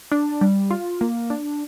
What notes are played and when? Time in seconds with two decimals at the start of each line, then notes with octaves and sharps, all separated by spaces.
0.12 D4
0.41 G3
0.71 F4
1.01 A#3
1.30 D4